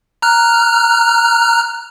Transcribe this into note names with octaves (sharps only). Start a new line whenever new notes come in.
A#5 F6 F#6